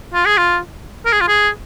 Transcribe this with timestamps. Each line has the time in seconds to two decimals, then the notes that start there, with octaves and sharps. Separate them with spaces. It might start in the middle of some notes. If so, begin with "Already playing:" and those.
0.14 F4
0.26 G#4
0.38 F4
1.06 A#4
1.13 G#4
1.21 F4
1.28 G#4